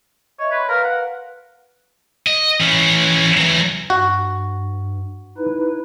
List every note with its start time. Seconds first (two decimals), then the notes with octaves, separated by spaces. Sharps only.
0.39 C#5 D#5 E5
0.52 B4 C#5 C6
0.69 A#4 B4 F5
0.84 F#5
2.27 D#5
2.61 E3 C#4
3.37 E3 F#3
3.90 G2 F#4
5.37 D#4 E4 B4